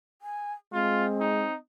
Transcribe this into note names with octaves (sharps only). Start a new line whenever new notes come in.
G#5
G#3 C4 F4
D#4